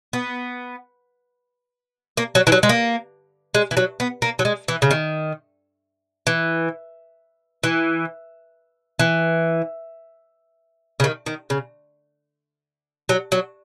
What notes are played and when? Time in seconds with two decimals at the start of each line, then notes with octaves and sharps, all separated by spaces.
0.13 B3
2.17 A#3
2.35 F#3
2.47 E3
2.52 F#3
2.63 G#3
2.69 A#3
3.55 G#3
3.71 E3
3.77 F#3
4.00 B3
4.22 A#3
4.39 F#3
4.45 G#3
4.68 E3
4.82 C#3
4.91 D#3
6.27 E3
7.63 E3
8.99 E3
11.00 C#3
11.04 D#3
11.26 D#3
11.50 C#3
13.09 F#3
13.32 F#3